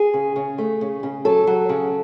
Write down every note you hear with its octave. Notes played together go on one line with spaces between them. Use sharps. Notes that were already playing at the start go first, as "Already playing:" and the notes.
Already playing: G#4
C#3
C#3
A3
C#3
C#3
F#3 A4
F#3
C#3